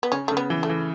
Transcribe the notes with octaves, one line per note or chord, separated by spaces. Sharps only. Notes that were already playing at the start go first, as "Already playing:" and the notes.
B3
C#3 C#4
C#3 A3
B3
E3
A3
E3